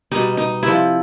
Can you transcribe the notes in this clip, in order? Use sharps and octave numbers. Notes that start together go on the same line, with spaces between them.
B2 G3 D#4
D#4
C3 F3 E4